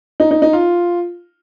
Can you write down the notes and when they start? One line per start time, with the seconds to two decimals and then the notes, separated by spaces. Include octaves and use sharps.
0.20 D#4
0.31 D#4
0.42 D#4
0.53 F4